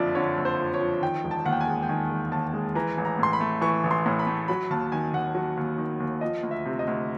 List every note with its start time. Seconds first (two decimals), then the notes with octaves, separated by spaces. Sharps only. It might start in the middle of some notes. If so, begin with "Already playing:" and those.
Already playing: F#1 F2 D3 F3 D5 E5
0.15 D3 C#5
0.37 F#1
0.45 C5
0.60 F2
0.74 C#5
0.80 F3
1.02 D#3 G5
1.24 E1
1.31 A5
1.46 D#2 F#5
1.52 G5
1.61 G#5
1.67 G#3
1.83 G5
1.89 D#3 G#5
2.10 E1
2.32 D#2 A5
2.53 G#3
2.75 E3 A#5
2.98 A1
3.05 A#5
3.19 A2 C6
3.33 B5
3.40 A3
3.61 E3 C#6
3.84 A1
3.91 C6
4.06 A2
4.19 B5
4.26 A3
4.48 F#3 B5
4.70 D#2 A5
4.92 D#3 G#5
5.13 D#2 F#5
5.35 F#3
5.57 D#2
5.78 D#3
6.00 D#2
6.21 F3 D#5
6.43 D2
6.51 E5
6.66 C3
6.79 D#5
6.87 D2